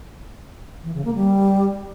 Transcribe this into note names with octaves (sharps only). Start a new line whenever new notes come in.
E3
C#3
A#3
G3